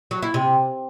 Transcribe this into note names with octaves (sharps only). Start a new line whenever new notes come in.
F#3
E4
C3